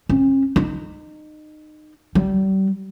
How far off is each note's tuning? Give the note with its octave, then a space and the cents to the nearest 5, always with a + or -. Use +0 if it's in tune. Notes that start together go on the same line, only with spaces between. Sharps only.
C#4 -45
D#4 -25
G3 -35